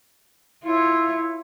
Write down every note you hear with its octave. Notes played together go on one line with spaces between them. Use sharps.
E4 F4 C#5